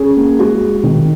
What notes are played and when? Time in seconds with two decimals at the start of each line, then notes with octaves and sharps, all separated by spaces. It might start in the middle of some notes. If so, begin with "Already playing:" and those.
Already playing: C#4 G#4
0.17 A#3
0.39 G#3 F#4
0.62 G#3
0.83 D#3